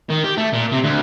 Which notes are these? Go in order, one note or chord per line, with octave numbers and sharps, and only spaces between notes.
D#3
G4
A3
A#2
C3
D2